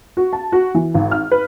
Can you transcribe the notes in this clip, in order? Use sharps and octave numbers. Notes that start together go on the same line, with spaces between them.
F#4
A5
F#4
E3
G#1
F6
B4